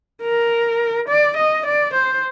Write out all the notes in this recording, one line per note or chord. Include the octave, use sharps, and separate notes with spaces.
A#4
D5
D#5
D5
C5